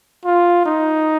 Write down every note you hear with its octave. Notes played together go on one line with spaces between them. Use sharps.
F4
D#4